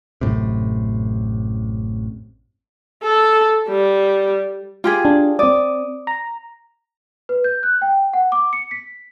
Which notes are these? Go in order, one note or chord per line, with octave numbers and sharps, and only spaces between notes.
A1 F#2 A2 C3
A4
G3
F4 G4 G#4
D4
C4 D5 D#6
A#5
B4
G6
F#6
G5
F#5
D6
C#7
B6